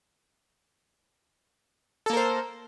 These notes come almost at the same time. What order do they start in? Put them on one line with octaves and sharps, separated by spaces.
A4 A#3 A#4 C5